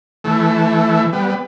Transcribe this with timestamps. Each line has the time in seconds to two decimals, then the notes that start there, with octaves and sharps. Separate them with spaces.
0.24 E3 A3
1.13 G3 B3
1.29 B3